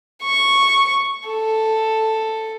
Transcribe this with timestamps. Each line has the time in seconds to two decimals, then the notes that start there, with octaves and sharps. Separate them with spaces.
0.23 C#6
1.28 A4